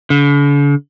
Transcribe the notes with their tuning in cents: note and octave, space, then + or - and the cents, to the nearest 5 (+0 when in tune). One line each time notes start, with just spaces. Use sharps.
D3 -45